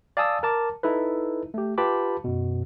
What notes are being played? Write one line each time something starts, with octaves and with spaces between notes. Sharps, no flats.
D5 F5 G#5 A5 D#6 E6
A#4 A5 D6
D#4 E4 A4 B4
A3 G4
F4 G4 B4 A5 B5 D6
F#2 B2